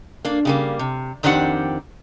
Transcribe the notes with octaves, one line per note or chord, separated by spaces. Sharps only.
A#3 D4
C#3 G3 A#3
C3
F2 D#3 C4 D4 G4 F#5